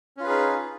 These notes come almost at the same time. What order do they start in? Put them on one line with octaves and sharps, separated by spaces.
C#4 F4 B4 G#4 D#4